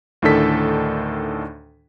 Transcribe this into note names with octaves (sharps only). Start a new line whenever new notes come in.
D2 A2 D#3 D4 A4 B6